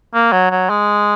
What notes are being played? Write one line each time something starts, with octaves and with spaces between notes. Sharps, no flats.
A#3
F#3
F#3
G#3